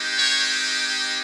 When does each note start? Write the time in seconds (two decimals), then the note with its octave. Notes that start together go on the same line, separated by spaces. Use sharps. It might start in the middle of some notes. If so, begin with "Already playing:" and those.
Already playing: G#3 C4 D#4 G4
0.18 C#5